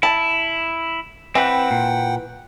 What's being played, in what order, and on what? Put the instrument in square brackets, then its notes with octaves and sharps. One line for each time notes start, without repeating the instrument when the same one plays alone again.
[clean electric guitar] E4 [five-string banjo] A5
[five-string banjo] E3 [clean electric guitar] C4 B4 [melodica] F#5 G5
[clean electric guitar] A#2